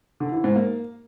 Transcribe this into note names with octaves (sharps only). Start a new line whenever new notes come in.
D3
E3
G#2
A#3